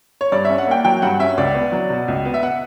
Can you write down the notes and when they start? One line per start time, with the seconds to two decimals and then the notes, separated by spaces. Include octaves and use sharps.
0.21 C#5
0.32 G2 D5
0.45 E5
0.50 C#4
0.58 F#5
0.68 A#3 G5
0.84 F#3 G5
1.02 G2 F#5
1.19 C#4 E5
1.37 C#2 D5
1.54 B3
1.72 F#3
1.90 B2
2.08 C#2
2.25 B3
2.34 E5
2.43 F#5